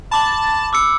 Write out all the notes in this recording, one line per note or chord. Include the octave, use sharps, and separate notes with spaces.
A5 B5 D6 F#7
D6 E6 C#7